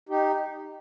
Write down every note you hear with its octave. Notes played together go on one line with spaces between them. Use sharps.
D#4 G4